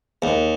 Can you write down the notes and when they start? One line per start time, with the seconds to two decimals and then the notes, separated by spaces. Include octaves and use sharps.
0.22 D#2